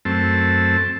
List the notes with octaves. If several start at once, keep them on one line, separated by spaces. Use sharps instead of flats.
F#2 A3 C4 A5